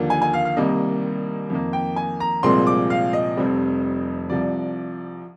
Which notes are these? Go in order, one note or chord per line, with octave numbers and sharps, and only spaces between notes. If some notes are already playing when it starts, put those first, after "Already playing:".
Already playing: D#2 D3 F3 A#3
G#5
G#5
F5
F5
C2 C3 D#3 G3 A#3 D#5
F2 D#3 A#3
G5
G#5
A#5
C2 A#2 F3 G#3 C4 C6
D6
F5
D#5
F1 F2 C3 G3 C4
C2 C3 F3 D5